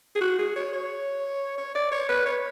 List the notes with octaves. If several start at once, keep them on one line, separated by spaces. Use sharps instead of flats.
G#4
F#4
G#4
C#5
C#5
C#5
D5
C#5
B4
C#5